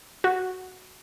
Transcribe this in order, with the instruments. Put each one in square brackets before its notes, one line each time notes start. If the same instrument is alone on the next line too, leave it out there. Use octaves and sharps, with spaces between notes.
[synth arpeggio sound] F#4